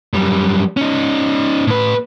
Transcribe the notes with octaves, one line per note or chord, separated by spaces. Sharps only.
F#2 G3
C#4 D#4
A2 B4